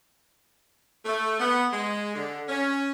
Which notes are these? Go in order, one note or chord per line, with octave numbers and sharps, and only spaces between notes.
A3
B3
G#3
D3
C#4